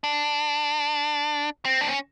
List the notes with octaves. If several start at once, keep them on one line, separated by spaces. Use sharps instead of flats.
D4
C4
D4
C#4